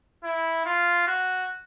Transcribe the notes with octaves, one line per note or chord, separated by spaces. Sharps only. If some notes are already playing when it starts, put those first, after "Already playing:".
E4
F4
F#4